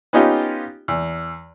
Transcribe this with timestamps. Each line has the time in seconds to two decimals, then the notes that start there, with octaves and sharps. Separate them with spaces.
0.13 B3 C#4 D#4 F4 G4
0.88 E2